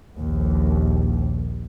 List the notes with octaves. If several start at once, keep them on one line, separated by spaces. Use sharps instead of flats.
A#1 D#2